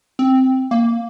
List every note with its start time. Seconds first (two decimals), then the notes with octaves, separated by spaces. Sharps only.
0.19 C4
0.71 A#3